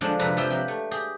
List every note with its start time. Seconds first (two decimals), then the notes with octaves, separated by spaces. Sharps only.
0.01 D3 F3 G#3 D4
0.19 F2 C3 B4 A#5
0.37 F3 G4 E5 G5
0.50 F#3 G4
0.68 A3
0.91 G4 G#4